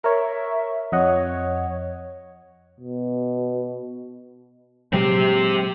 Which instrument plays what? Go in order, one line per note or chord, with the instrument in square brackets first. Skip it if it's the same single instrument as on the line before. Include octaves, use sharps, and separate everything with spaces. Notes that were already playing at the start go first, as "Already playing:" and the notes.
[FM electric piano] A#4 C#5 [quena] E5
[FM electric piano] F2 D#5 F#5 [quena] C#5
[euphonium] B2
[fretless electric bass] A#2 F#3 G#3 [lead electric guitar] C4 G4